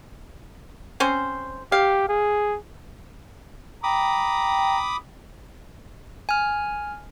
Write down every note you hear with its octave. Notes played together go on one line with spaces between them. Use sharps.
C4 C#4 C5
G4 F5
G#4
G5 A#5 B5 D6 D#6
G#5 F6